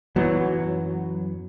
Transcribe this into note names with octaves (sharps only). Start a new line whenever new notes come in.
F#2 E3 F#3 B3